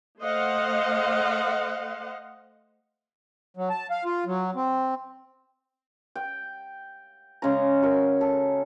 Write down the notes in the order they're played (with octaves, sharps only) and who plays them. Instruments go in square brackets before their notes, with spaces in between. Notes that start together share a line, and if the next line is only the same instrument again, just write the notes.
[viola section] A3 C5 D#5 F5 F#5
[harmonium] F#3
A5
F5
F4
F#3
C4
[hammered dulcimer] G5
C#3 G#3 C#4 A#5
F#4 A#4
A4